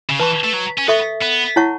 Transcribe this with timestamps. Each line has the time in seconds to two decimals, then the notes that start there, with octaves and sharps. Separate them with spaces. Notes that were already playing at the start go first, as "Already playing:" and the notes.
0.10 C#3
0.19 E3 B4 A5 C#6
0.44 A3
0.53 F#3
0.79 C#4
0.88 B3 A4 E5 C#6
1.22 B3
1.56 E4 C#5 F#5 A5 C#6